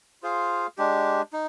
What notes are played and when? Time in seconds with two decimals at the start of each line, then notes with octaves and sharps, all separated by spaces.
0.23 F4 G#4 C5 F5
0.78 G#3 D4 G4
1.33 D#4